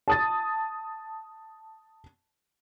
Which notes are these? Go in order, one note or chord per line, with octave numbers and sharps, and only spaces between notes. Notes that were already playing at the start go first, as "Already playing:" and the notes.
A5 D#6 A6